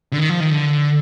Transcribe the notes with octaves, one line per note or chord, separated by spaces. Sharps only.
D3
D#3
F3
D#3
D3